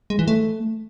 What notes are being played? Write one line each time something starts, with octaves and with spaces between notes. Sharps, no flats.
G#3
E3
A3